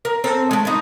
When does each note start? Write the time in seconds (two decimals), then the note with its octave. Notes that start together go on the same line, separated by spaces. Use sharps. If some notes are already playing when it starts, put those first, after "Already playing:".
0.05 A#4
0.24 C4 A4 A#4
0.51 G#3 A3
0.65 G3 D#4